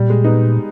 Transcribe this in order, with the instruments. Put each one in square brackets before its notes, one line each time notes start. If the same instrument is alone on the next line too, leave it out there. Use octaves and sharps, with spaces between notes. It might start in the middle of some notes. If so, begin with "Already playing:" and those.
Already playing: [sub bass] A#2 [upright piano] G3
[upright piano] G#3
B3 D#4